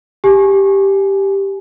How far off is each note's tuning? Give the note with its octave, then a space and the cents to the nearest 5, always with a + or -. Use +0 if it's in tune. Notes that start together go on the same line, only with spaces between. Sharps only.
G4 +0 G#5 +20